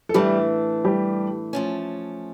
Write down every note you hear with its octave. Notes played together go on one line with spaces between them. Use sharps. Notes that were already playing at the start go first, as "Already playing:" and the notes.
A4
A2 E3 G3 A3 D4 G4
G3 G4
F3 A3 C#4